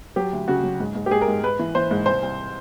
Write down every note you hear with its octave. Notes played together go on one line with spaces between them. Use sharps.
F#3 G4
D2
C#3 F#4
F#3
G#2
G#2
G4
G#2 G#4
A#4
G#2
G#2 B4
E3
E3 C5
G#2
C2 C5
C2